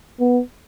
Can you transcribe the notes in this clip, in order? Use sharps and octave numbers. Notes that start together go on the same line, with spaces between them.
B3